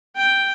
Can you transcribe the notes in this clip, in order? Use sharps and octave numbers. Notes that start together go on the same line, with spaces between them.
G5